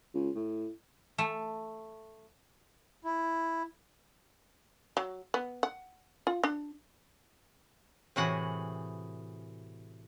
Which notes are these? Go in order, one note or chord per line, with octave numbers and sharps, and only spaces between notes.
C#2
A2
A3
E4
F#3
B3
F#5
F4
D4
A2 C3 E3 F#4 G#4 F#5